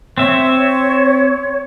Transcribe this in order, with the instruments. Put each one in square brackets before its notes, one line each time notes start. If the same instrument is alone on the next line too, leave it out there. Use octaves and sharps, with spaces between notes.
[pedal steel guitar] C4 E5 [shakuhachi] C#5